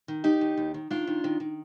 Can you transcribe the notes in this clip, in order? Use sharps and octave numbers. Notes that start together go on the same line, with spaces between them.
D#3
D#2 D#4 G4
D#2
D#2
D#3
D#3 D4 F4
D#3
D#3
D#3